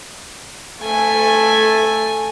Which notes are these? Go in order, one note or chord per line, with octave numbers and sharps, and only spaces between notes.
A3 G#5